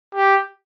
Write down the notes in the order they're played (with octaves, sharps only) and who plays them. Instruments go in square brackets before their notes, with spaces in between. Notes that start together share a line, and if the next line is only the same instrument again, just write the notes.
[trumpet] G4